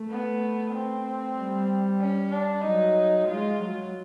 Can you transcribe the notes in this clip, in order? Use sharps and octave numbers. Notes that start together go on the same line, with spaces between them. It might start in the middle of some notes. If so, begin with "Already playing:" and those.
Already playing: A3
B3
C4
G3
C#4
D4
F#3 D#4
G#3 F4
F#3